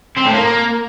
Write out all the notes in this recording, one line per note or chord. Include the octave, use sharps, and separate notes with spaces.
C4
A2
A#3